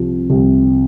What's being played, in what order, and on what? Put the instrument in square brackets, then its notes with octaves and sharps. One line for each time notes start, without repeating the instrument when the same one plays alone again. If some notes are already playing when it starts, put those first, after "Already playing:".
Already playing: [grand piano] C2 C3 F3
C2